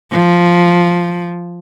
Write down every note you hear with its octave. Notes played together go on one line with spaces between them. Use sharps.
F3